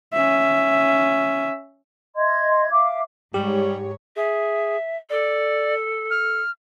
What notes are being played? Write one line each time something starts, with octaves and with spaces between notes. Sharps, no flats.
C#4 E5
D#5 E5 C6 G#6
E5 F5 D6
G#2 G3 G4 C#5
G#4 E5
A4 D5
F6